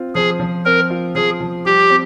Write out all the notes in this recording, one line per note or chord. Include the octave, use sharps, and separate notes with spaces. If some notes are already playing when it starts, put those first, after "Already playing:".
Already playing: C4 F4
F3 G#4
F3
C4 A#4
F4
F3 G#4
F3
G3 G4
C4